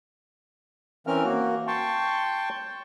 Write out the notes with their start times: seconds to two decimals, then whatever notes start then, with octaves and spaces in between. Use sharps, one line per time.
1.07 E3 C4 C#4 A#4 F6
1.24 A#3 F#4
1.67 G5 A5 C6 C#6